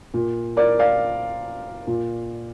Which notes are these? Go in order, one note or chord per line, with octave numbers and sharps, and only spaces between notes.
A#2
A#4 D5
D5 F5
A#2